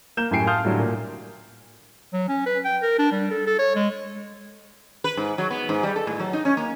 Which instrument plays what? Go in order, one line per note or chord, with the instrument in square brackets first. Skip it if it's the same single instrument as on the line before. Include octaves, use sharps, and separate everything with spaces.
[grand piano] A#3 G6 E7
F#2 A2 G4 G#5 C7 D7
F5 A5 C6 D#6 F6 G6
A2 D3 F#3 G3
A#2
[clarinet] F#3
C#4
B4
G5
A#4
D4
G3
A4
A4
C#5
G#3
[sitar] B4
G#2
F#3
B3
G#2
G3
A4
A2
F#3
D#4
C#4
A#3